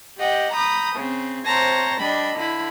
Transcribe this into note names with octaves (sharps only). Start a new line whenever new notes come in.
G4 D#5 F#5 G5
A#5 B5 D#6 G6
C#3 C4
C3 C5 C#5 A5 A#5 A#6
G3 D4 D#5 B5
D3 E4 B5